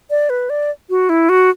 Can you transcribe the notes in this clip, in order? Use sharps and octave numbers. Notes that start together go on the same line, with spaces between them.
D5
B4
D5
F#4
E4
F#4